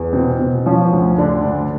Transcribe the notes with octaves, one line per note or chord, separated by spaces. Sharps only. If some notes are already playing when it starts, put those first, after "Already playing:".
Already playing: E2
B2 C4
B2
F3 C#4
D2
D3 D4
D2